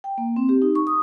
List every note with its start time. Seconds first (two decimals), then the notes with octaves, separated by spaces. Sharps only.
0.04 G5
0.18 A#3
0.36 C4
0.49 G4
0.62 D#4
0.75 C#6
0.87 D#6